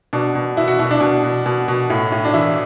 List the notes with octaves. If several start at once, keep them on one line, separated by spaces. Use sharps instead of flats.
B2 D4
B2
B2 E4
F#4
B2 E4
D4
B2
B2
B2
B2
A2
A2
D4
E3 E4